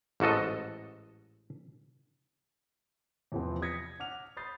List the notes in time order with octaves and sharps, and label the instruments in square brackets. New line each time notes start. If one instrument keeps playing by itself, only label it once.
[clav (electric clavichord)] A1 G#2 F#4 A4 D#5
[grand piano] E2 C3 F3 B3 C4
D#6 G#6 A#6 B6 C#7
F#5 D6 F6 F7
B5 D#6 G6 A6 C7